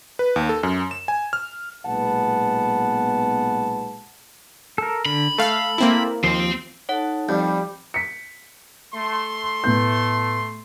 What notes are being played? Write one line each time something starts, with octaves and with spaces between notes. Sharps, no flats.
B4
D#2
A4
F#2
E7
G#5
F6
B1 A#2 G#3 B3 F#5 A5
A4 A#4
D3 B5
A3 A4 F5
A#3 C4 E4
D#2 F3 C4
D#4 A4 C#5 F#5 A5
F2 G3 G6
B6 C#7
A3 C6
A2 B3 G6